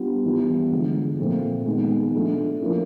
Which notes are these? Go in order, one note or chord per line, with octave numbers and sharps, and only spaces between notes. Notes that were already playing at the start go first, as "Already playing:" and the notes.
Already playing: G3 B3 D4 F4
E3 G3 B3 E4
D3 F3 G#3
A#2 F3 A3 C4
D#3 G#3 B3
F3 A3 D4
F3 A#3 C#4 E4